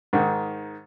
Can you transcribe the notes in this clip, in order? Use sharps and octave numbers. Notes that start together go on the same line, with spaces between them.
G#2 D#3